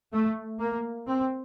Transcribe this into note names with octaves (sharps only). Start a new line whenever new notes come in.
A3
A#3
C4